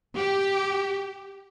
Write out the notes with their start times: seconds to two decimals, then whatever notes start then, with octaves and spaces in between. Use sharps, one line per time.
0.15 G4